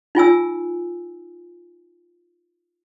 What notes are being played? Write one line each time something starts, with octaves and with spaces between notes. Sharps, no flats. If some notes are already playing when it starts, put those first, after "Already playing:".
D#4 F4 G#5 E6